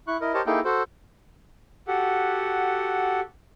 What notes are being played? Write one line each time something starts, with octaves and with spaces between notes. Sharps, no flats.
E4 C#6 F#6
E4 A#4 D#5
G4 A#4 C5 C#5 D#5 A5
A#3 D#4 E4 G#4 A4 G5
F#4 A4 C5
F#4 G4 A4 F#5